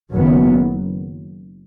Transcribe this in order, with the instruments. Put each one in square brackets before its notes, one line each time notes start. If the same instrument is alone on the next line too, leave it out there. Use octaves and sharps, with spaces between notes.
[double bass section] F#1 F#2 D#3 F#3 B3